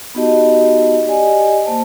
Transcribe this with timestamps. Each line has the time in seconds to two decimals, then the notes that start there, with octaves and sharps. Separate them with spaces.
0.15 B3 D#4 F#4 G4 D#5 A5
1.07 G4 D5 D#5 G#5
1.66 A#3 C5 A5